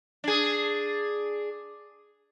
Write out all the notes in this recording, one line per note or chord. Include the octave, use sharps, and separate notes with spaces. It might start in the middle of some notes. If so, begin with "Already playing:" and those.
D4 G#4